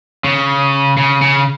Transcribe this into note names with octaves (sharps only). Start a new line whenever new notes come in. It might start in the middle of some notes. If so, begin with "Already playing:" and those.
C#3
C#3
C#3